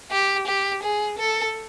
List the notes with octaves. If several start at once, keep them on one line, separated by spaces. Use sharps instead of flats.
G4
G4
G#4
A4